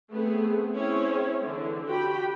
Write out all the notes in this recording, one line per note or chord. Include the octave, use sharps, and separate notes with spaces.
A3 B3 C4 G#4
C4 C#4 E4 G#4 C#5
D3 E3
F#4 G4 G5 B5